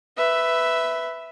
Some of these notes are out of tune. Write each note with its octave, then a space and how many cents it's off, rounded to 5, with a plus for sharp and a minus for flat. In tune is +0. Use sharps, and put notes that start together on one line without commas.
B4 +10 E5 +0